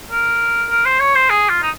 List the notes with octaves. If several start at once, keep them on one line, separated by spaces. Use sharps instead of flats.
A#4
A#4
C5
C#5
C5
G#4
F4
D#4